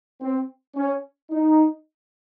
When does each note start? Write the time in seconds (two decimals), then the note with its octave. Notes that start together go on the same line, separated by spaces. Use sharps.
0.21 C4
0.76 C#4
1.31 D#4